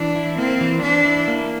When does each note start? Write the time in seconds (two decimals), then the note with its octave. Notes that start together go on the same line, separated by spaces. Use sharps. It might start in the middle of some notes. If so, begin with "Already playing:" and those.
Already playing: E3 D4
0.16 E4
0.38 A#3 C4
0.61 E3
0.83 E3 D4
1.05 E4
1.28 A#3